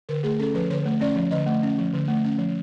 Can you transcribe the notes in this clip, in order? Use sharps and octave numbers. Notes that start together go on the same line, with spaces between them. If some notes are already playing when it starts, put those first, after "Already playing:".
D3 A#4
A3 G#4
C#4 A4
F3 B4
D3 C#5
A3
C#4 D5
F3
D3 D#5
A3
C#4
F3
D3
A3
C#4
F3